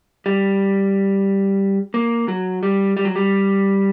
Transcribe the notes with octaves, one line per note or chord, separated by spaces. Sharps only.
G3
A#3
F#3
G3
G3
F#3
G3